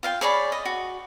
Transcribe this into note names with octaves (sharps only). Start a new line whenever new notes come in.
F4 F5 G5
G#4 C#5 D5 B5
D#5
F#4